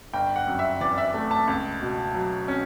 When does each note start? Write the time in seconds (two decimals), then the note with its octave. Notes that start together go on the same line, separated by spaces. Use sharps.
0.13 G1 G5
0.36 F#5
0.47 F#2
0.59 E5
0.81 E3 D5
0.98 E5
1.14 A3
1.31 A5
1.47 C#2
1.81 B2
2.14 F#3
2.48 C#4